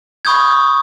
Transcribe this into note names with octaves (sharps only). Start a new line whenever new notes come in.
B5 C#6 D#6 G6 G#6